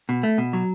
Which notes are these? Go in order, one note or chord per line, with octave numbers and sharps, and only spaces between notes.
B2
A3
B2
F#3